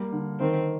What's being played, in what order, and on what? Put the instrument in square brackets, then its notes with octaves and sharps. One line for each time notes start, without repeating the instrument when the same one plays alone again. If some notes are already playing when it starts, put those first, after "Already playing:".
Already playing: [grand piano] G3 A#3
D3
[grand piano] D#3 [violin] C4